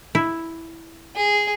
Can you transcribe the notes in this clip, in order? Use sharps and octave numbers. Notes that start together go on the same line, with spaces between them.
E4
G#4